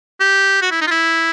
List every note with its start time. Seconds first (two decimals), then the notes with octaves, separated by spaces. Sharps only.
0.20 G4
0.62 F#4
0.71 E4
0.81 D#4
0.87 F4
0.91 E4